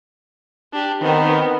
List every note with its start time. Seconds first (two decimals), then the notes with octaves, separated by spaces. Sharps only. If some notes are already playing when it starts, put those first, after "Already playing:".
0.73 D4 G4
1.01 D#3 B3 C4